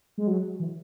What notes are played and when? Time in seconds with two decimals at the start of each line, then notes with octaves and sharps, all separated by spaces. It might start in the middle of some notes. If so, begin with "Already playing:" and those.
0.18 G#3
0.27 F#3
0.60 E3